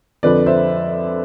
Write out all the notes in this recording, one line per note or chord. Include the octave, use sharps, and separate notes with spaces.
F2 D3 F3 B4 D5
C5 E5